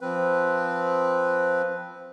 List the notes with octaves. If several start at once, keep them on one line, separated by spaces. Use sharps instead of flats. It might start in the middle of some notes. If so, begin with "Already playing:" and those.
F3 C4 B4